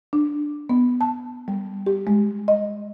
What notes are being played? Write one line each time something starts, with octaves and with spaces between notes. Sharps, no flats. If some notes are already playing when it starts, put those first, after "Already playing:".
D4
B3
A5
G3
G4
G#3
D#5